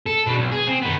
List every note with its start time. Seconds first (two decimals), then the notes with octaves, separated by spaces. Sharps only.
0.06 A4
0.26 B2 D4
0.39 B1
0.51 G#4
0.67 C4
0.82 D#3 B3